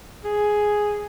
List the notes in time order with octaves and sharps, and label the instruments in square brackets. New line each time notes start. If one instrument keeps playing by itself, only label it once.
[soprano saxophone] G#4